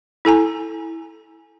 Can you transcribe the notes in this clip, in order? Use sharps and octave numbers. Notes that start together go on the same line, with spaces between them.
E4 A4 G#5 A#5